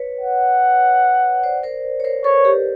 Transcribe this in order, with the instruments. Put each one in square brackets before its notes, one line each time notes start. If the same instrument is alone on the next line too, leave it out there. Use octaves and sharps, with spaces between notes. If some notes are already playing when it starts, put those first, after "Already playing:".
Already playing: [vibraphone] B4 C#5
[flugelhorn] F#5
[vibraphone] C5 D5
A#4 C5
C#5
A#4 C5
[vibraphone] A4 B4 [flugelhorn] C#5
[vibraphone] G4 A4